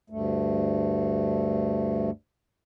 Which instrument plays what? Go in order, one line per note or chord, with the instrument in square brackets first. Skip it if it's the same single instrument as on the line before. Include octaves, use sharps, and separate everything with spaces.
[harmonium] D2 G2 A3